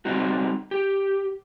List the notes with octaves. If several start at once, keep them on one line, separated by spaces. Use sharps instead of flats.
G3 C4 D#4 F#4
G4